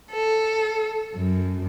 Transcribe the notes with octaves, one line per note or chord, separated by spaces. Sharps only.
A4
F#2